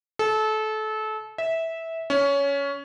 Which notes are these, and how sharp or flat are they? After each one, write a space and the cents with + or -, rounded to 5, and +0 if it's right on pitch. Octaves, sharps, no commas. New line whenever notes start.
A4 -25
E5 -15
C#4 +15